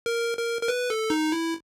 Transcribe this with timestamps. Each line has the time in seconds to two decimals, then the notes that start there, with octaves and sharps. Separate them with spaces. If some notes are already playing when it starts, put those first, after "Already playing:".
0.06 A#4
0.37 A#4
0.61 A#4
0.68 B4
0.90 A4
1.10 D#4
1.32 E4